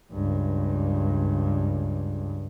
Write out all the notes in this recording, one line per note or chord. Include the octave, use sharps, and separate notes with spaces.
C#2 G2